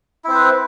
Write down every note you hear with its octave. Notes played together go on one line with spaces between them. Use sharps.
C4 E4 B4 C5